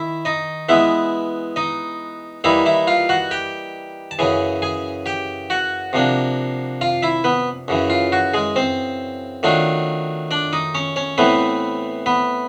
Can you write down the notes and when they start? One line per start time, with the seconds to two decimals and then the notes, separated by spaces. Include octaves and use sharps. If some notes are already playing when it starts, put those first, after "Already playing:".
Already playing: D#3 E4 E5
0.25 D#4 D#5
0.69 E3 G#3 B3 E4 E5
1.56 D#4 D#5
2.44 E3 G3 A#3 D#4 E4 E5
2.66 E4 E5
2.87 F4 F5
3.09 F#4 F#5
3.31 G4 G5
4.11 A5
4.19 F#2 C#3 E3 G#4 G#5
4.62 G#4 G#5
5.06 G4 G5
5.50 F#4 F#5
5.93 C3 F3 A#3 D4
6.81 F4 F5
7.03 E4 E5
7.24 B3 B4
7.68 F#2 C#3 E3
7.90 F4
8.12 F#4
8.34 G#3 G#4
8.56 C4 C5
9.43 D#3 F#3 A3 D4 F4
10.31 D4 D5
10.53 D#4 D#5
10.75 C#4 C#5
10.96 C#4 C#5
11.18 A2 E3 A3 B3 C4 B4
12.06 B3 B4